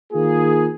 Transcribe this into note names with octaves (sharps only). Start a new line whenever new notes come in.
D#3 A#3 F4 G#4